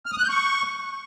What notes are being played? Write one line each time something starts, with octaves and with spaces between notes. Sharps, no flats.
F6
D#6
F#6
G6
C#6